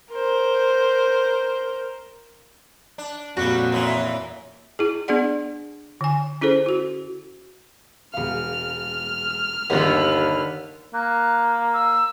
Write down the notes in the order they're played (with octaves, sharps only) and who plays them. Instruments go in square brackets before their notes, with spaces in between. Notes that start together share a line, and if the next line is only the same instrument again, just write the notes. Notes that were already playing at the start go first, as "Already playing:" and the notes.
[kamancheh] A#4 C5
[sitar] D4
[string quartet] F2 A#2 [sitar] F#3 G3 [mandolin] F#4
[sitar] F#2 E3 C#4
[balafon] E4 G#4
B3 D4 G#4 D5 F#5
D3 G#5
C#4 E4 G#4 A4 C5
E4 F#4
[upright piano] E1 F5 [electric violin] F6
[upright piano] G1 D#3 [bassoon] D#2 [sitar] D3 B3
[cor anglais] A#3 [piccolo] F#6
[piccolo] E6